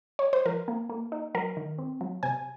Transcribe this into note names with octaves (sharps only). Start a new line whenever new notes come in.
C#5
C5
F3 A#4
A#3
A#3
D#4
F#3 A#4
D#3
C4
F#3
C3 G#5